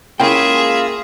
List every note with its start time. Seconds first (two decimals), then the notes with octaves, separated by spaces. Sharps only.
0.20 G#3 A#3 C#4 E4 F4 G#4 E5 G5